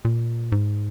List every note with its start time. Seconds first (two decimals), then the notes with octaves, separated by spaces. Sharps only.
0.05 A#2
0.52 G#2